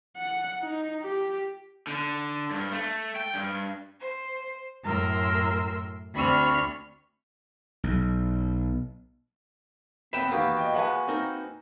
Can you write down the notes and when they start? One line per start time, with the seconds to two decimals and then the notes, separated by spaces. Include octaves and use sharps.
0.17 F#5
0.62 D#4
1.03 G4
1.87 D3
2.51 G2
2.72 A3
3.16 G5
3.34 G2
4.00 C5
4.83 F#2 A2 A#4 C6 E6
6.12 D2 C4 D4 B5 C#6 F6
7.84 B1
10.13 D#2 B3 C4 B4 E5 G5 E7
10.32 E2 D#3 A#3 B3 F#4 G4
10.57 D#5 G5
10.74 F3 G#3 B4 F#5 G#5
11.08 C4 D#4 A#4